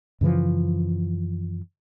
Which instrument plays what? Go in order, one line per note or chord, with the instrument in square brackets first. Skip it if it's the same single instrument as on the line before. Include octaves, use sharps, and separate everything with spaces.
[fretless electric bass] F#2 C#3 E3 F3